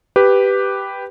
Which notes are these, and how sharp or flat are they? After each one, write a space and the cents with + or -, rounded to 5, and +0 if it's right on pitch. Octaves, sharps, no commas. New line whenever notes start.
G4 +0 B4 +0